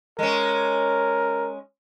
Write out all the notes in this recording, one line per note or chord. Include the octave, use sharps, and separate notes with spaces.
G#3 C#4 A#4